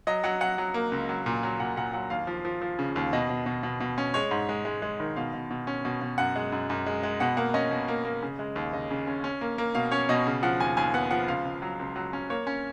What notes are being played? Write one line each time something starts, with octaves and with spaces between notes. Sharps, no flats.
F#3 D#5
F#3 F#5
F#3 F#5
F#3
A#3
C#2
F#3
A#2
F#3
A#2 F#5
A#2 F#5
F#3 F#5
D#2 F5
F3
F3
F3
C#3
D#2
B2 D#5
B2
B2
B2
B2
C#4
G#3 C#5
G#2
G#3
G#3
G#3
D#3
B2 F5
B2
B2
C#4
B2
B2
F#2 F#5
G#3
F#2
F#2
G#3
G#3
B2 F#5
A#3 F#5
C#4 D#5
B2
A#3
A#3
C#3
G#3
D#2
C#3 D#5
C#3
C#4
C#4
A#3
A#3
B2 F5
C#4 C#5
B2 D#5
C#3
F3 F#5
D#2 G#5
D#2 G#5
B3 F#5
F3 F#5
C#2 F5
C#2
F#3
C#2
F#3
C#4
A#3 C#5
C#4